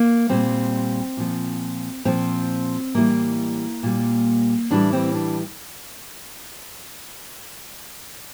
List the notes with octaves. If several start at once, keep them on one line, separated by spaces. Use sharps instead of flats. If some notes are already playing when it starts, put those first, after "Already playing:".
Already playing: A#3
A#2 G3 C4
A#2 F3
A#2 F3 C4
A2 E3 G3 A#3
A#2 G3
A2 E3 G3 D4
C4
D4